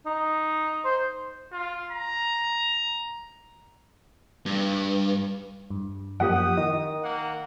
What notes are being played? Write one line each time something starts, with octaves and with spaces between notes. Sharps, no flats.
D#4
C5
F4
A#5
G2
G2
F#2 F3 A#3 G4 F#5 D#6
D#3 D#5
A#3 F#5